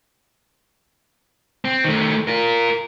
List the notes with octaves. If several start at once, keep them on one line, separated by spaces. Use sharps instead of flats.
C4
D#3 A3
F4 A#4